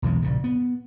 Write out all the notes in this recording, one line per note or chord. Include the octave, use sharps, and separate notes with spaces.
B1 E2 F#3 G#3
A#1 G2 C#3
B3